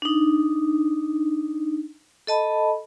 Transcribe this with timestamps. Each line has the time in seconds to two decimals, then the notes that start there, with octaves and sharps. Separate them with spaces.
0.02 D4 D#4
2.27 A4 D#5 A5 B5